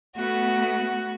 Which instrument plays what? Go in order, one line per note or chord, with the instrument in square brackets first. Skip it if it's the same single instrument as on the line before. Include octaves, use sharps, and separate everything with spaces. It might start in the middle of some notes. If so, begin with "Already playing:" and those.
[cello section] A3 B3 [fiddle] F#4 [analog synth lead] F#5